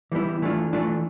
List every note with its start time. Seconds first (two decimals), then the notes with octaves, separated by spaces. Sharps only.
0.12 E3 G3 B3 E4
0.42 E3 A3 D4 F4
0.73 E3 A3 D4 F4